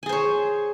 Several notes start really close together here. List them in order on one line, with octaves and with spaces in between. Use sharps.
G#5 G#4 C5 C#5